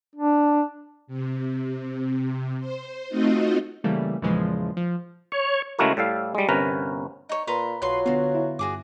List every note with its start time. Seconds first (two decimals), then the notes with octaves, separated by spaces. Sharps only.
0.15 D4
1.07 C3
2.59 C5
3.09 A3 C4 D#4 F4 F#4 D#5
3.84 C#3 E3 G3 A3 A#3
4.22 E2 A#2 C#3 E3 F3 G#3
4.77 F3
5.32 C#5
5.79 C#3 G#3 A3 E4 F#4 A#4
5.97 A2 G3 A4 F5
6.35 G3 G#3
6.49 G1 C3 C#4 A#4 B4 A#5
7.29 D#4 C#5
7.47 A#2 B4 A#5 C6
7.82 B1 F#3 F4 B4 C6 C7
8.06 D3 B3 F4 F#4
8.35 E4
8.59 G2 F#4 G#4 D6